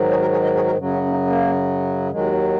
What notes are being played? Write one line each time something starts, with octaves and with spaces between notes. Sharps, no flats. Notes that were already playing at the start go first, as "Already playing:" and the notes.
Already playing: G#2 D#3 F#3
G#4 C#5
F#4 A#4
G#4 C#5
A#4 D#5
G#4 C#5
F#4 A#4
F#2 C#3 F#3
C#4 F#4
C#4
A#3 D#4
A#3
D#2 D#3 F#3 G#3